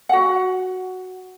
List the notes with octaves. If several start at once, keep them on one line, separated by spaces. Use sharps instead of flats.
F#4 F#5